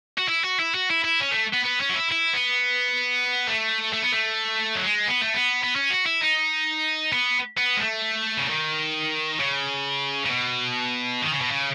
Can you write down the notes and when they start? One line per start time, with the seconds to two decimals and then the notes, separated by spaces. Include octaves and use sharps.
0.18 F#4
0.29 E4
0.44 F#4
0.60 E4
0.75 F#4
0.90 E4
1.04 E4
1.21 C#4
1.32 A3
1.54 B3
1.65 B3
1.81 C#4
1.91 F#4
1.96 E4
2.12 E4
2.34 B3
3.47 A3
3.93 A3
4.02 B3
4.12 A3
4.75 F#3
4.84 G#3
5.07 B3
5.21 A3
5.34 B3
5.64 B3
5.76 C#4
5.91 F#4
6.06 E4
6.21 D#4
7.13 B3
7.57 B3
7.77 G#3
7.80 A3
8.37 C#3
8.48 D#3
9.40 C#3
10.26 C#3
10.31 B2
11.22 D#3
11.32 C#3
11.41 B2
11.51 C#3